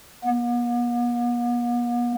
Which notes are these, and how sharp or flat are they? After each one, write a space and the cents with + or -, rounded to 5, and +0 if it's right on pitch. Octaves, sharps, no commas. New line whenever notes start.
B3 -45